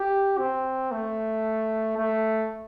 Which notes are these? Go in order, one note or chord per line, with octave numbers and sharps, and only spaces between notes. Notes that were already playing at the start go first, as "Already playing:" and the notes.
Already playing: G4
C4
A3
A3